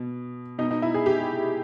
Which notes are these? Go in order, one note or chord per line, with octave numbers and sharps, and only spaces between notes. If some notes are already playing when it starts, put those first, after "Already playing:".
Already playing: B2
B2 D#4
D#4
E4
G#4
G4